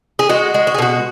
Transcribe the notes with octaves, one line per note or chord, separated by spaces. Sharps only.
G#4
G#3 F#4
G#3
F#4
G#4
B2 F#4